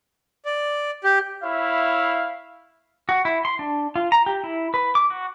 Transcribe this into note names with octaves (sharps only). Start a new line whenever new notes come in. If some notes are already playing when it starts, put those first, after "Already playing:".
D5
G4
E4 C#5 E5 F5 B5
F#4
E4
C6
D4
F4
A#5
G4
E4
B4
D6
F#4